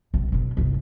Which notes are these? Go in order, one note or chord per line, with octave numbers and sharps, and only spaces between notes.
B1
B2 D3
G1 C2